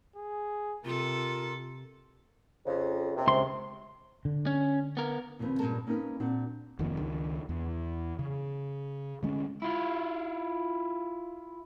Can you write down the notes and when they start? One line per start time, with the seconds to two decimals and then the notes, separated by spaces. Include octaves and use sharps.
0.16 G#4
0.85 C3 F4 A4 A#4
2.66 F2 C#3
3.15 D#2 C3
3.27 C#2 C6
4.25 D3
4.47 C#4
4.97 B3 A#4
5.39 D#2 C#3 F3 A#3 C4 B4
5.59 G2 A#2 G#3 C#4 A#4 A5
5.87 A#3 C#4 D#4 G#4 A#4 B4
6.20 A#2 C4 D4 F#4
6.79 F1 D#3 F3 A#3
6.98 C#2 D#3 D4
7.49 E2
8.19 C#3
9.23 D3 G#3 C#4
9.62 E4 F4